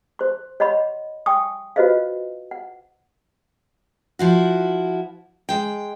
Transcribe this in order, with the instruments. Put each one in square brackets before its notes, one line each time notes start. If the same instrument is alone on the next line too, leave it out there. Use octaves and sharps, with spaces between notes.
[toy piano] C5 C6
C#5 D#5 F#5 B5 C6
G5 G#5 C6 C#6 D#6
F4 F#4 B4 C5 D#5 F5
F#5
[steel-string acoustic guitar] F3 E4 F#4
G#3 G5